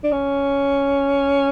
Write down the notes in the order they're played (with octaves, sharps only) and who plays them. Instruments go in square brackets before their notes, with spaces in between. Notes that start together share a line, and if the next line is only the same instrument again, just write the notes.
[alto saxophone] D4
C#4